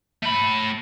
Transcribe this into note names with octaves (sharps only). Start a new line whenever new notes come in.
A3 B5